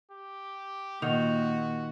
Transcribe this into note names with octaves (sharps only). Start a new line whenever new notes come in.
G4
A#2 D#3 F#4 D#5 F#5 F7